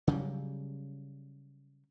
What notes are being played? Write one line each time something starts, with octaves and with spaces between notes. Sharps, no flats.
C#3 F#3 G3